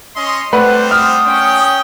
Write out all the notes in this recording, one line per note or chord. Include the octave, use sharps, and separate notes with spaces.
C#4 D#5 C6
G3 A3 C4 B4 C5 D5 F#5
D#6 F6
C#4 G5